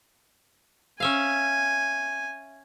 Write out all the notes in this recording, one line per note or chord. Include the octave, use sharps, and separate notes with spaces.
C#4 E5 F5 G#5